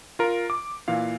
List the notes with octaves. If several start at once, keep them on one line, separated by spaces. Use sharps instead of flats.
F4 A#4
D6
A#2 E3 F5